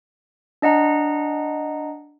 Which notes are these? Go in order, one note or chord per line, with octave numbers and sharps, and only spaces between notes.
D4 D#5 F#5 A#5